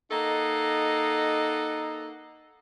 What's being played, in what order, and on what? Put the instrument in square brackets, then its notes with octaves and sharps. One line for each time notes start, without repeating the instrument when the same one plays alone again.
[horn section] A#3 D#4 A4 D#5 F#5